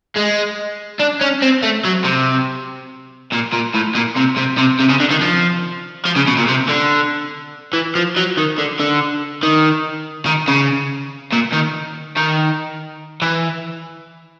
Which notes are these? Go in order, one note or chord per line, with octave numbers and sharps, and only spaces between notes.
G#3
D4
C#4
C4
A3
F#3
C3
A#2
A#2
A2
A#2
C3
C3
C3
C3
C#3
D3
D#3
F3
F3
C#3
B2
A#2
C3
D3
E3
F3
F#3
D#3
D3
D3
D#3
D#3
C#3
A#2
D#3
D#3
E3